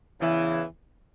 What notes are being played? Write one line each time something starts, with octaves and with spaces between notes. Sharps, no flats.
E2 C#3 E3